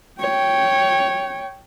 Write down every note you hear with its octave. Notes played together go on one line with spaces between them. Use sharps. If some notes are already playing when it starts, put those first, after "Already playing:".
C#5 G5